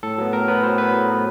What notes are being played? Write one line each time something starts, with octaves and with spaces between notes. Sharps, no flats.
A2 A4
F#3 B3
A2 A#4
F#3 B3 B4
A2 C5
F#3 B3 B4
A2
F#3 B3